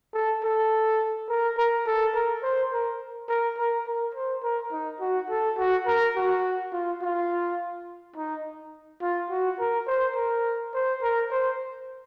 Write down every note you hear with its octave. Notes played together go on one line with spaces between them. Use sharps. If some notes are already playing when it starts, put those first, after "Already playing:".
A4
A4
A#4
A#4
A4
A#4
C5
A#4
A#4
A#4
A#4
C5
A#4
D#4
F#4
A4
F#4
A#4
F#4
F4
F4
D#4
F4
F#4
A#4
C5
A#4
C5
A#4
C5